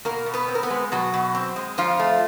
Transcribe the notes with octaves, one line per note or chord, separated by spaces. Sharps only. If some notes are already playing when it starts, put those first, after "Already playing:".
B2 A#3 A#4
B2
B3 B4
C4
A#4
B3 B4
G#3
B2 F#3 F#4
B2
C4
G#3
F2 F3 F4
A3